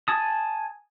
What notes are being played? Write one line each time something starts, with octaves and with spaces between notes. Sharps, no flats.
G#5 A5 D#6